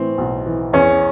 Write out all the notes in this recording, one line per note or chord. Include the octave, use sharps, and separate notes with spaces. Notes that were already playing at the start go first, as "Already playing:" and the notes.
Already playing: A2 E3 C4
B1
E3
E2 C#4